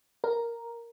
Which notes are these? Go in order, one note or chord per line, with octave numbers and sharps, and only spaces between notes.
A#4